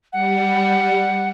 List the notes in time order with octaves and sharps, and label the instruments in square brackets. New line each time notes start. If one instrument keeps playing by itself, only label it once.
[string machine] G3 [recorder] F#5